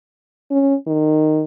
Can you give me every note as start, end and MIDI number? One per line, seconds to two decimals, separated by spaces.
0.51 0.75 61
0.87 1.44 51